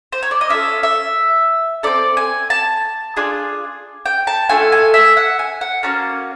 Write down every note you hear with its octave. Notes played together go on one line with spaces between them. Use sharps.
C5
C#5
D5
D#5
C#4 F4 A4 E5
E5
C4 E4 A4 D5
G#5
A5
D4 F4 G#4
G5
A5
A3 D4 F4 A4 G#5
G#5
E5
F#5
G#5
F#5
A#3 C#4 F#4 A5